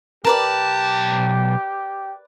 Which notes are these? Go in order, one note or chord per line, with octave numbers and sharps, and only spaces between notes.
B1 G4 A#4 B4 D5 A5